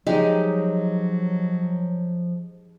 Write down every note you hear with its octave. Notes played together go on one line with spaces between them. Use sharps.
F3 F#3 G#3 D#4 G4